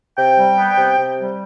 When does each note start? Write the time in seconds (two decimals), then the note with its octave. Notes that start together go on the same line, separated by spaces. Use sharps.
0.17 C3 G5
0.38 G3
0.58 B3
0.78 C3
0.99 C3
1.19 G3